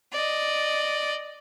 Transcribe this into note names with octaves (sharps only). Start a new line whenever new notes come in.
D5 D#5